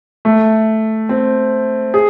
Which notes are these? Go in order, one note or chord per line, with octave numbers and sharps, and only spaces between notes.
A3
C4
G#4